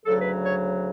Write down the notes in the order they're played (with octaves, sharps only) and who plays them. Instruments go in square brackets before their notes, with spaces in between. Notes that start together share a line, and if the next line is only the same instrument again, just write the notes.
[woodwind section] D2 C#3 F#3 A4
B4
C#5